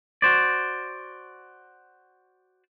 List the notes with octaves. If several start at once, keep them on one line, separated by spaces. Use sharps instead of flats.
F#4 C5 D5